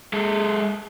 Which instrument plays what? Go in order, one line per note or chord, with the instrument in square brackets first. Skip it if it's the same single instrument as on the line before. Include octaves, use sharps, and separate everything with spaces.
[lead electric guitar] G#3 A4